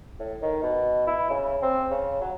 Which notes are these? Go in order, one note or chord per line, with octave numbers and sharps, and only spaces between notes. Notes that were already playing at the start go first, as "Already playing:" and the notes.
A2
D#3
B2
E4
C#3
C4
C#3
F#3